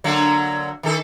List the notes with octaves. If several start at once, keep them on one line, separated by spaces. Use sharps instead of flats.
D3 F#3 A#3
D#3 A4